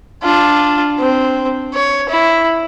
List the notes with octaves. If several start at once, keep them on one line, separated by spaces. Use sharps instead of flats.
D4 F4
C4
C#5
E4